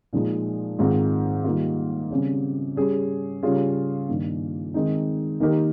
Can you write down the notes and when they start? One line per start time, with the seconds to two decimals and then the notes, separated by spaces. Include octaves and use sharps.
0.13 A#2 F3 G#3 D#4
0.79 G#2 D#3 G#3 C4 F4
1.44 D#3 G3 A#3 F4
2.10 C#3 G3 C4 G4
2.76 G3 C#4 G#4
3.43 C#3 G3 C#4 F4 G#4
4.08 G2 D#3 A#3
4.74 D#3 G#3 C4 D#4
5.40 D#3 A#3 D#4 G4 A#4